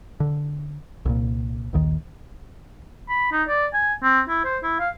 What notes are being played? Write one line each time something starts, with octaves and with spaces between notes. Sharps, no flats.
D3
C2 A#2
A#1 D#2 D#3
B5
D#4
D5
G#5
C4
E4
C5
E4
F5